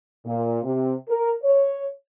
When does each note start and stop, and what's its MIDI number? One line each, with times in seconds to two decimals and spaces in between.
0.25 0.59 46
0.63 0.94 48
1.08 1.31 70
1.44 1.86 73